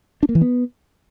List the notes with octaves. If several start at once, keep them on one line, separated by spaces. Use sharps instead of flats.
D4
A#3
E3
B3